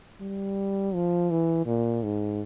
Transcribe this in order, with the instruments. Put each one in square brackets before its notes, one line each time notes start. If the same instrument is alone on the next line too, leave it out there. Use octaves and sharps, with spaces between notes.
[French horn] G3
F3
E3
A#2
G#2